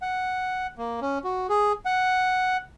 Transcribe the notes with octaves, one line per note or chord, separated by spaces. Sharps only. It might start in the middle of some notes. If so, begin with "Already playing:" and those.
F#5
A#3
C#4
F#4
G#4
F#5